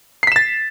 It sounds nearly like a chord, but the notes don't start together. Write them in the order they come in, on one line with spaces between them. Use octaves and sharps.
C7 B6 E7 A6